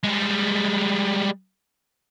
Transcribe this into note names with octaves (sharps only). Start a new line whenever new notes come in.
G3 G#3